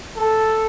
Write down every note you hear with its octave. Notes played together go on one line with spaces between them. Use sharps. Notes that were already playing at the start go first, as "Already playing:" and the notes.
A4